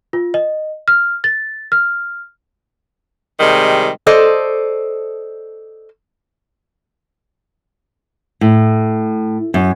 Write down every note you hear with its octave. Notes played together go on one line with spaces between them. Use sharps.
F4
D#5
F6
A6
F6
C3 D#3 G3 G#3
A4 C5 D5 D#5
A2
F#2